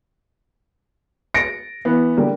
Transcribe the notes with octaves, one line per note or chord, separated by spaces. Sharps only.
A6 A#6 C#7 D7
E3 B3
D3 G3 A#3